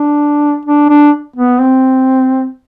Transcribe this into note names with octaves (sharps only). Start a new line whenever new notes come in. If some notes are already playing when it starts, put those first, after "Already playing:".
Already playing: D4
D4
D4
B3
C4